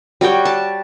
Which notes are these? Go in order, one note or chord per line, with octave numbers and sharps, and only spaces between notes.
G3 F#4 C#5 G5
A5